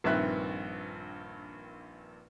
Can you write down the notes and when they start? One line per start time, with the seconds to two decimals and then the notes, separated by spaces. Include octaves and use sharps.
0.04 A#1 G2 D#3 C4 E5 F#6